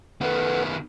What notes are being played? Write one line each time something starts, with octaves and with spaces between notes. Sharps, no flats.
D#3 B3 A4 B4 F#5